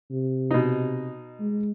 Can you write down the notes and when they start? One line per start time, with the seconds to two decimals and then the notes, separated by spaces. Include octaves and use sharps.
0.11 C3
0.51 B2 D#4
1.40 G#3